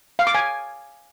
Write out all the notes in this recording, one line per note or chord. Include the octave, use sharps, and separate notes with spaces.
F5
D6
G#5